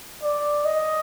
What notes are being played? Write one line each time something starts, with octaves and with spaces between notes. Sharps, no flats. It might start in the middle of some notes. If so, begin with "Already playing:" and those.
D5
D#5